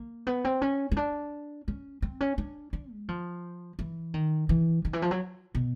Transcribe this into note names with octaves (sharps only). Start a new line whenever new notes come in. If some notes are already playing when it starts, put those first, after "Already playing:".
Already playing: A#3
B3
C4
C#4
C#4
D4
C#4
C4
C#4
D4
D4
G#3
F3
E3
D#3
E3
D#3
E3
F3
F#3
B2